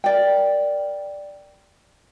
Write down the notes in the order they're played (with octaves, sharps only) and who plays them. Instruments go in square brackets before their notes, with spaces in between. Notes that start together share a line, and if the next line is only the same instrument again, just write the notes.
[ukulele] A#4 D5 G5